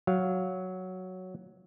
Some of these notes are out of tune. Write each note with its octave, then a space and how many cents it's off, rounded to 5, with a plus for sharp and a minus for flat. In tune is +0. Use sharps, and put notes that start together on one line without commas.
F#3 +0 F5 +0